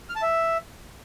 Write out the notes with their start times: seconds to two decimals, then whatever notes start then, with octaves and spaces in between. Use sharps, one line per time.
0.09 F6
0.16 A5
0.22 E5